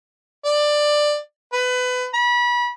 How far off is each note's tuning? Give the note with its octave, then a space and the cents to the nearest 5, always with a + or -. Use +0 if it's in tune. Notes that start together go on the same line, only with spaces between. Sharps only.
D5 +15
B4 +25
B5 -30